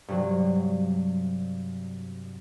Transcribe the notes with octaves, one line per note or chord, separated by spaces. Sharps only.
G2 C3 F#3